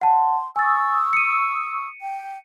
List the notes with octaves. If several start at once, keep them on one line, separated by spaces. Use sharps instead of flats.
F#5 A5 C6
G#5 C#6 D#6 E6 A6
C#7 D#7
G5